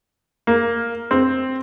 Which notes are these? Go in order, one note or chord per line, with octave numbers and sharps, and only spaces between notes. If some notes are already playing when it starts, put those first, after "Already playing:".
A#3
C4